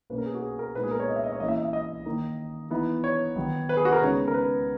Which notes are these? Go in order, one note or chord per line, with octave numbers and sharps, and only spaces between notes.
B2 A#3 C#4 B4
A#4
G#4
F#4
G#4
A#4
A#2 G#3 B3 D#4 B4
G#4
A#4
C#5
D#5
E5
D#5
C#5
E3 A#3 C#4 D#5
E5
D#5
E5
D#5
D#3 A#3 D#4
E3 B3 D#4
C#5
D#3 F#3 B3 D#4
B4
G#4
F#4
A#4
C#3 G#3 B3 D#4 C#5
A#4
B4